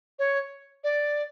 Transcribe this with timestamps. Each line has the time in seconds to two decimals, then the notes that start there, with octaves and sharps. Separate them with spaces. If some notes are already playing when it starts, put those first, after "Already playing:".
0.19 C#5
0.84 D5